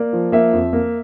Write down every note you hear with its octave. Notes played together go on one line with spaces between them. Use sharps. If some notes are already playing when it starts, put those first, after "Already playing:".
Already playing: A#3 D5
F3
A#3 E5
F2
A#3